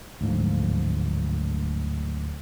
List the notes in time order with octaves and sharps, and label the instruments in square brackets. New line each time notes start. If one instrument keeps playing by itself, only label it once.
[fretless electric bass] D1 D2 G#2 F3